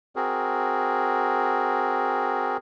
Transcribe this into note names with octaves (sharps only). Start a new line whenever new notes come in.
C4 F#4 G#4 A#4